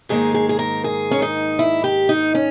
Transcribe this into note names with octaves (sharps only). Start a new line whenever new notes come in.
G#2 D#3 A#3 G#4
G#4
G#4
A#4
G#4
C#4
D#4
E4
G4
D#4
C#4